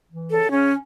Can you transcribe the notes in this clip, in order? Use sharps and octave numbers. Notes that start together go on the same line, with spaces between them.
E3
C#3 A4
C#3 C#4